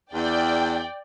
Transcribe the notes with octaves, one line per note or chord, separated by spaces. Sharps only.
E2 D5 G5